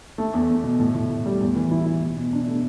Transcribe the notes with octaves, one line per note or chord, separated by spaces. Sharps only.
A3
E2
E2
B2
A2
A2
A2
G3
E2
E3
E4
E4
B2
B2
D4
A3